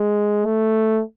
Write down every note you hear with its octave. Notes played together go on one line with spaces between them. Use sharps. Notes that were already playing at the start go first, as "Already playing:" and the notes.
Already playing: G#3
A3